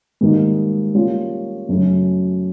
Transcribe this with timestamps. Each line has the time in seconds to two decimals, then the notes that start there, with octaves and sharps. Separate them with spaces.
0.21 G#2 D#3 G3 A#3 D#4
0.95 G3 A#3 C#4 F4
1.69 F#2 C#3 F#3 A3 C#4